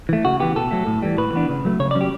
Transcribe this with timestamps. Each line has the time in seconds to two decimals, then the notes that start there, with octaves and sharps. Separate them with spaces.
0.09 E3 A3
0.25 C#3 F#4
0.40 E3 B3 G4
0.56 B2 A4
0.71 F#3 A3
0.87 A2
1.02 E3 G3
1.18 A2 B4
1.33 E3 B3 D4
1.49 C#3
1.65 F#3 A3
1.79 C#3 C#5
1.91 D5
1.95 F#3 C#4
2.01 G4